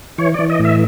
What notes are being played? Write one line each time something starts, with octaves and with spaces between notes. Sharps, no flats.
E3 C#5
E3 D5
D#5
A2
E5